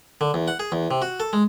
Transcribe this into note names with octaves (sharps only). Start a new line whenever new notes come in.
D3
E2
F#5
G#4
E2
C3
F#4
A4
G#3